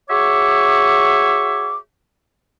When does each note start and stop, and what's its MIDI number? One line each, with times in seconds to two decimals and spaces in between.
0.10 1.77 66
0.10 1.77 68
0.10 1.77 73
0.10 1.77 76
0.10 1.77 85
0.10 1.77 86